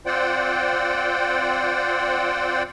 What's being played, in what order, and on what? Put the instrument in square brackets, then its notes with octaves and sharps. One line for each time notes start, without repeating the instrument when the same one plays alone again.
[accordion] C4 F4 C5 D5 F#5 G5